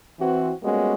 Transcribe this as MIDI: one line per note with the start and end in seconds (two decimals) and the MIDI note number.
0.20 0.52 52
0.20 0.52 60
0.20 0.52 66
0.63 0.94 55
0.63 0.94 56
0.63 0.94 58
0.63 0.94 59
0.63 0.94 61
0.63 0.94 66